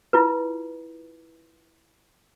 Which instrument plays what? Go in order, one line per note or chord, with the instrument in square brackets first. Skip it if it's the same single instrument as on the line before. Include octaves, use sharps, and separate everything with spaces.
[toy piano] E4 F4 B4